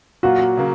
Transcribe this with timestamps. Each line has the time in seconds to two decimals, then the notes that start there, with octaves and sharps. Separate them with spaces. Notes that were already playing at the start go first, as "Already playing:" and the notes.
0.23 A#2 F#3 A#3 F4 F#4
0.57 C#3 F#3 A#3